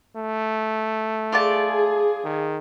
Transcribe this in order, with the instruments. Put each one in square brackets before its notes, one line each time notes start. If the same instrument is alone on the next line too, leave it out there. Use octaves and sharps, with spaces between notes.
[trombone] A3
[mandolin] F4 D5 A5 [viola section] G#4
[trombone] D#3